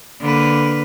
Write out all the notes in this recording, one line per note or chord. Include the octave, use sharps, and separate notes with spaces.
D3 A#3 B4